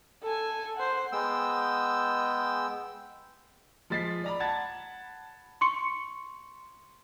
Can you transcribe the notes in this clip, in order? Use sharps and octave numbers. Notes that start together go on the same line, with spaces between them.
A4 G#5
C5 F#5
G#3 B3 G5 E6
F3 G#3 A6 B6 C7
D5 A#5 B5
F#5 A5 B5 G#6 A6
C6 C#6 C#7